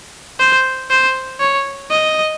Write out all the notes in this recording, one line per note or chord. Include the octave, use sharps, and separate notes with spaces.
C5
C5
C#5
D#5